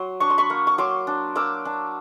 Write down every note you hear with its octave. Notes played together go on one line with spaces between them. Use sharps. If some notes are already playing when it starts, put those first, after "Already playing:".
Already playing: F#3 C6
D4 C#6
C6
B5 C#6
A#3
C#6
F#3 C6 D6
D4
A#3 D6 E6
D4